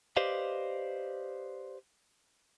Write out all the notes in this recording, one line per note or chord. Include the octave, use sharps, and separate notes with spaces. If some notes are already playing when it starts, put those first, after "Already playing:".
G4 B4 C5 D5 D#5 F5